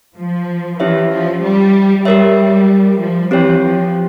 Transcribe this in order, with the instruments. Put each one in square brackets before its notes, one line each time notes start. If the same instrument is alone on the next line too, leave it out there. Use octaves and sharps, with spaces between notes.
[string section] F3
[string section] E3 [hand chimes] C#4 E4 G4 C#5 E5
[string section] F3
G3
[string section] G3 [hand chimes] G4 A#4 C#5 E5
[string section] F3
[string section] E3 [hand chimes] C4 G4 C#5 G5
[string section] F3